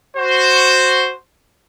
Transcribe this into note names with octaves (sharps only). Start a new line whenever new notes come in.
F#4 C5